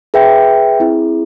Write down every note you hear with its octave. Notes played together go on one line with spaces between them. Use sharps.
G#4 B4 E5 G5
C4 E4 G#4